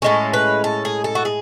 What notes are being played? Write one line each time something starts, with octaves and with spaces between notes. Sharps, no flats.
A2 G#3 C#4 A4
B4
A4
G#4
A4
F#4
G#4